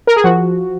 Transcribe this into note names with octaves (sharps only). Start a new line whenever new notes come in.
A#4
G#4
F3 F#4